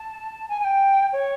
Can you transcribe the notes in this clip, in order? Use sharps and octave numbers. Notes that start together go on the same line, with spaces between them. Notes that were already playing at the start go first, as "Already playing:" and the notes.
Already playing: A5
G#5
G#5
G5
C#5